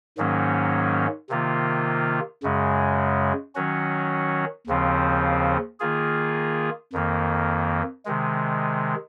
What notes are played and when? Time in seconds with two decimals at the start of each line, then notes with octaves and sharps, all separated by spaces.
0.18 G#2 D#3 F#3 A#3 C#4
1.29 C3 D#3 A#3 F4
2.43 F#2 C#3 G#3
3.55 D#3 F#3 C#4 F#4
4.67 D#2 C#3 F3 C4
5.80 D#3 A#3 F4 G#4
6.93 F2 D#3 A#3
8.05 C3 D#3 G#3